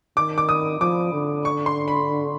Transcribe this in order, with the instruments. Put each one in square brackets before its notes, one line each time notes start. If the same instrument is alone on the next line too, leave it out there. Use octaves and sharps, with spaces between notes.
[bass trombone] D#3 [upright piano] D6
[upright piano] D6
D#6
[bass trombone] F3 [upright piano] D6
[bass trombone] D3
[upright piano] C#6
C6
B5